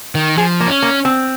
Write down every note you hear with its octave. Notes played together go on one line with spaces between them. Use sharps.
D#3
F3 G#4
A#3
C#4
A#3
C4